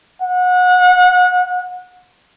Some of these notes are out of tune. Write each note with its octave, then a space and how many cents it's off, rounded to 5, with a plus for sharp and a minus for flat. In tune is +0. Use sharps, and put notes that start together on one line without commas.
F#5 -30